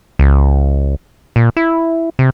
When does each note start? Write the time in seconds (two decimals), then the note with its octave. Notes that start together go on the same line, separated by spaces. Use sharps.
0.19 C#2
1.36 A#2
1.57 E4
2.19 C3